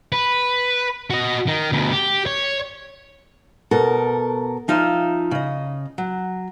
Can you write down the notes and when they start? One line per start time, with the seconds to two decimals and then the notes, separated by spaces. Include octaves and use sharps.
0.12 B4
1.10 F#4 D#5
1.47 D#3
1.72 D2 B2
1.92 G4
2.26 C#5
3.71 B2 A4 A#4
4.68 F3 D#4 F4 E5
5.31 C#3 D#5
5.98 F#3